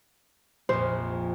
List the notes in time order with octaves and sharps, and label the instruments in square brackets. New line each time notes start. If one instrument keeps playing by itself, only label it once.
[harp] A#1 F2 [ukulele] C5